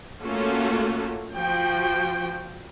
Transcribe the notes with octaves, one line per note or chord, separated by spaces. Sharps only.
A3 A#3 C#4 F4 F#4 A4
F3 F#4 G5